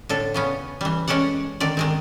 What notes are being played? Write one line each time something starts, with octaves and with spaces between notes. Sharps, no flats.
A2 D3 A4
C#3 B3 C#4
E3 G3
G#3 C#4 A4 D5 F#5
D3 D#3 D5
D#3 G#3 C4